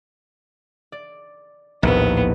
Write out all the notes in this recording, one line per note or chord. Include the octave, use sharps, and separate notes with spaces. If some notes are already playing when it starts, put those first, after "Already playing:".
D5
A#1 D#2 A2 B3